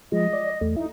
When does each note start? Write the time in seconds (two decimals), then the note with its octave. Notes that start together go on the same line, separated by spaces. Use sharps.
0.12 F3 G#3 D#5
0.33 D5
0.61 E2 A3
0.76 D#4 E4